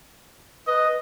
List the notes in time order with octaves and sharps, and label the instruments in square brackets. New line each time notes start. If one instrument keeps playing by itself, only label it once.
[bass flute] B4 [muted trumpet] D#5